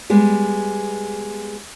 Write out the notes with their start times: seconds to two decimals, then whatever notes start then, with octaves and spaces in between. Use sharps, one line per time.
0.10 G3 G#3 B3